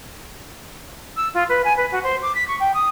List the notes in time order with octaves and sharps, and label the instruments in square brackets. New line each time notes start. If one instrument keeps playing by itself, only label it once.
[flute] E6
F4
B4
G#5
B4
F#4
C5
D6
B6
C#6
G5
D#6